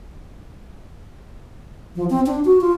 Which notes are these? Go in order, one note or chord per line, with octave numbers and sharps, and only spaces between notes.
F3
C4
D4
F#4
F4